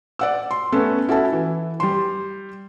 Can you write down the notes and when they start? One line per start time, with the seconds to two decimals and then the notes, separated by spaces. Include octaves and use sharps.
0.19 D5 F#5 E6
0.51 C6
0.72 A3 B3 C#4 A4
1.08 C#4 E4 F#4 A4 A5
1.32 E3
1.80 G3 C6